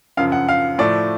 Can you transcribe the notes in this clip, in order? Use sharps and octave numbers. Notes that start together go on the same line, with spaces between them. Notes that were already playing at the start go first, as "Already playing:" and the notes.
F#2 C#3 F3 F5
F#5
F5
A2 F3 A3 D5